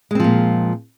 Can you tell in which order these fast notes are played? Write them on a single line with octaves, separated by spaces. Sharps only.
G#3 C4 F3 A#2